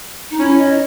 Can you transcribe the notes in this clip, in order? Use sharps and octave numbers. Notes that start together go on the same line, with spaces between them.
D#4
C#4 E4
D#5